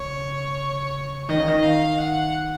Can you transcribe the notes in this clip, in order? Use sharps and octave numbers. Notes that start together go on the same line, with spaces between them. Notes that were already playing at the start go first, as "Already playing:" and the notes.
Already playing: C#3 C#5
D#3 D#5
C#3
D#3
F5
F#5